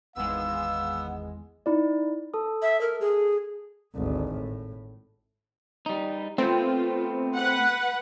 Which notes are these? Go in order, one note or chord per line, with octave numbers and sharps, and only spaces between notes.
G#1 E2 G#3 B3 F5 E6
D#4 E4 D5
A4 A5 D#6
E5
A#4
G#4
G#1 D2
A2
G3 D#4
A3 B3 C4 F4
B4 F#5